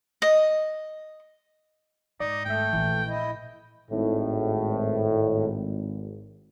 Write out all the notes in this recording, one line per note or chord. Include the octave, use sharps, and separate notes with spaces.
D#5
G#2 D#4 D5
G#1 A3 E5 G5
A#1 A#2 E3
E4 D#5
G#1 A2